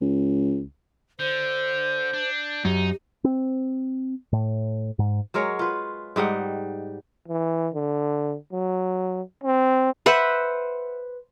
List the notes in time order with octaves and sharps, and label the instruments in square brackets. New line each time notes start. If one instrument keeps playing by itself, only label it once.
[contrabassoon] C#2
[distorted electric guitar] D3 [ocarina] C5 [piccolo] G6
[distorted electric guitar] D4
[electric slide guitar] F#2 [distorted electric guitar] D#4 [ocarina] G4
[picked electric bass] C4
A2
G#2
[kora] F#3 G#3 A#4 C#5
F4 B4
G#2 G3 D#4 F#5
[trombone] E3
D3
F#3
C4
[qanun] B4 C5 E5 F#5